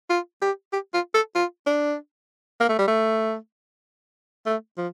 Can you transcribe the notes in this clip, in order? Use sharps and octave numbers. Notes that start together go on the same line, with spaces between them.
F4
G4
G4
F4
A4
F4
D4
A#3
A3
G3
A3
A3
F3